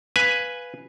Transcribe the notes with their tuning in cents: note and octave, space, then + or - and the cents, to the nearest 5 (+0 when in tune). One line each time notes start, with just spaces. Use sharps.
B4 +0 F5 +0 G#5 +0